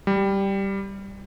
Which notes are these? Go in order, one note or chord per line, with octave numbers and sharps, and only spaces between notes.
G3